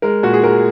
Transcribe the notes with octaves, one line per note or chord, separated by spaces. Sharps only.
G#3 A#4
A#2 F#4
G#4
G#3 A#4